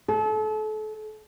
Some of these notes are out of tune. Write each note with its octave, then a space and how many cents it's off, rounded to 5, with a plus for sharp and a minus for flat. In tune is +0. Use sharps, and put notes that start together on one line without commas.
A4 -35